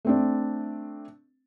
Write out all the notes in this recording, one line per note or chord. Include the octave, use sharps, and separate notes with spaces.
A3 C4 D4